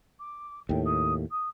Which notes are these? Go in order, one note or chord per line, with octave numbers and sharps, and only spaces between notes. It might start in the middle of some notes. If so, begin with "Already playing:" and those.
D6
D#2 A2 G5
D#6
D#6